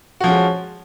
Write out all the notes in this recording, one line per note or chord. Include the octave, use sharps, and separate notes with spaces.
F3 G#3 C#4 F#4